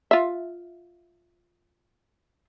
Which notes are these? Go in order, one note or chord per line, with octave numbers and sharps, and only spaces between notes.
F4 E5